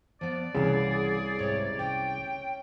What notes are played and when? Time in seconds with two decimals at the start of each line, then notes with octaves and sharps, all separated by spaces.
0.21 F3 B3 D5
0.55 C2 C#3 E3 G#4 F#5
1.39 G#2 C3 C#5
1.79 C#4 G5